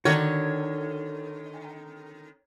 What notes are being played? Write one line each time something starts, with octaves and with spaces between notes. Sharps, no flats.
D3 D#3 F#4 A4 C#5 D5